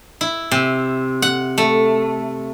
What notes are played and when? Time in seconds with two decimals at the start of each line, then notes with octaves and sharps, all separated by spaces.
0.21 E4
0.51 C3
1.22 F#5
1.58 A3